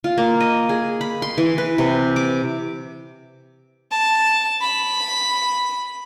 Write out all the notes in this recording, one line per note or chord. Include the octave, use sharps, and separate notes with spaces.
F4
A#3
D#5
G#4
B5
C6
E3
B4
C3
D6
A5
B5